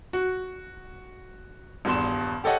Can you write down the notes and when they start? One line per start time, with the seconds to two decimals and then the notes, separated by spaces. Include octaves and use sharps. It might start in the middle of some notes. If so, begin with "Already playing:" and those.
0.13 F#4
1.85 D#1 E2 G2 C6 E7
2.44 G4 A4 C#5 D#5 F#5